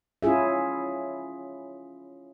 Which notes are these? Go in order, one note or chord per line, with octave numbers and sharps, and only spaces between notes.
C#4 E4 F4 G#4 E5